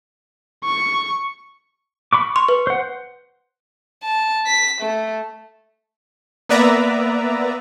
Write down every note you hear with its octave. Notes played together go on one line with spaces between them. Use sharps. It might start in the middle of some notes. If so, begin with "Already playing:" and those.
C#6
B5 C#6 D6
C6 C#6
B4
C5 F#5
A5
B6
A3
A#3 B3 B4 D5 E5 A#5